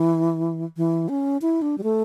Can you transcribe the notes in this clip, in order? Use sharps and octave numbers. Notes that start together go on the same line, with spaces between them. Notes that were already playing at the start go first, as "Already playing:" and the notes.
Already playing: E3
E3
C#4
E4
D4
G3
A3